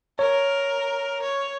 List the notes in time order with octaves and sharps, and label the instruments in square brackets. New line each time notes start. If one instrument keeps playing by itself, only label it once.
[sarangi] A#4 [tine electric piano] C#5
[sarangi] C#5